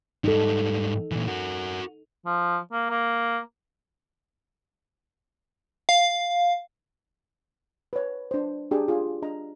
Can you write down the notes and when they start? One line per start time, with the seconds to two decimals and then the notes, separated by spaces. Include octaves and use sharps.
0.24 G#2 G3 D#4 A4
1.12 A#2 E3
1.27 F#4 A#4
2.26 F3
2.72 A#3
2.90 A#3
5.89 F5
7.93 B4 C#5
8.31 D4 C5
8.71 D4 G4 G#4 G5 A#5
8.88 F4 G#4
9.22 D4 D#5 A#5